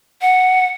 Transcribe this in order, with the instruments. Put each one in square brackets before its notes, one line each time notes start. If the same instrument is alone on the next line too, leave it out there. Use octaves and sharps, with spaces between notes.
[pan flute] F#5